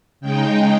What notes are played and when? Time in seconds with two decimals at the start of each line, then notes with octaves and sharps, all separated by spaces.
0.20 C#3 G#3 D#4 G5